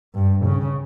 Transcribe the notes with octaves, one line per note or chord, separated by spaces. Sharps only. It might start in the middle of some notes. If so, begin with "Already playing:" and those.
G2
C#3